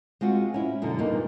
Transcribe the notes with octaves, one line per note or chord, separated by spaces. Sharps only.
G#3 C4 F4 F#4
C#4 E4
F#2 B2 D3
E2 G2 A#2 A#3 D#4